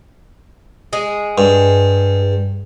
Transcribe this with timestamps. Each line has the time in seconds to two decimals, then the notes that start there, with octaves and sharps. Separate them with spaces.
0.93 G#3 G#4
1.38 G2